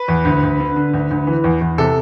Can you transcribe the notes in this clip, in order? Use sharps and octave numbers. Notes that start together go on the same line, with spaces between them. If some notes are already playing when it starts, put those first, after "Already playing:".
Already playing: B4
E2
D2
D2
D3
D3
D2
D2
E3
E2
E2
C3 A4